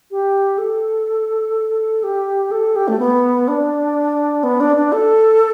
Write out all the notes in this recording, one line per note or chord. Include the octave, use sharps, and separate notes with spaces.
G4
A4
G4
A4
G4
A3
B3
D4
B3
D4
D4
A4